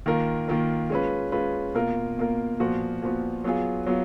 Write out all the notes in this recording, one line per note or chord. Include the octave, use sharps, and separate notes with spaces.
D#3 A#3 F4 A#4
D#3 A#3 F4 A#4
G#3 C#4 F4 B4
G#3 C#4 F4 B4
B2 A#3 F4 A#4
B2 A#3 F4 A#4
A#2 F3 B3 F#4
A#2 F3 B3 F#4
F#3 B3 F4 G#4
F#3 B3 F4